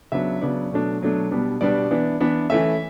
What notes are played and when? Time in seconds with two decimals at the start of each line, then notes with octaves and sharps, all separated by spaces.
0.12 C#3 F#3 B3 D4 E5
0.41 C#3 F#3 B3 D4 D5
0.71 B2 F#3 A3 D4
1.01 B2 F#3 A3 D4
1.31 B2 G3 B3 D4
1.61 B2 G3 B3 D4 D5
1.91 E3 B3 D4
2.20 E3 B3 D4
2.50 E3 A3 C#4 E5